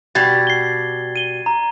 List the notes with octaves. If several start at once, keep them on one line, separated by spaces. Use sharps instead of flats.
B2 G3 G#6 A6
C7 G7
D#7 G7
A#5